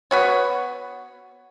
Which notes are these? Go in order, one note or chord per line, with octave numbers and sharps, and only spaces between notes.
B3 F#4 C#5